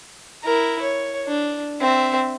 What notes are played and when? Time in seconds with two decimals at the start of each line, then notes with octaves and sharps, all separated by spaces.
0.44 E4 A#4
0.82 C#5
1.27 D4
1.81 C4 E5